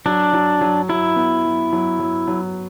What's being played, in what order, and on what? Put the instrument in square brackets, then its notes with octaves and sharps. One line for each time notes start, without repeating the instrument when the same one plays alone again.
[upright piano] F#3 [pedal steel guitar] D4
[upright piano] F#3
F#3
[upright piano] F#3 [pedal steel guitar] E4
[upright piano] B3
F#3
F#3
F#3
F#3